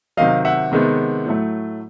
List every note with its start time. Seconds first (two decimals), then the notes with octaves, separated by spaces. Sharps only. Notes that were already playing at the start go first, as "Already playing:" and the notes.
0.17 C3 D#3 F#3 D#5 F5
0.45 E5 F#5
0.72 C3 D#3 G#3 B3
1.26 A2 F#3 A3